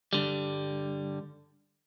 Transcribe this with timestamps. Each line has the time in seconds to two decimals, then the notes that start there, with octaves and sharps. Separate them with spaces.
0.13 G2 D3 G3